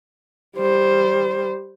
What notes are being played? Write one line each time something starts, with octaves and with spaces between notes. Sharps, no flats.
G3 C5